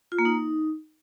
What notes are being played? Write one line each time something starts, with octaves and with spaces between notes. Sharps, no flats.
F4
A#3
D#4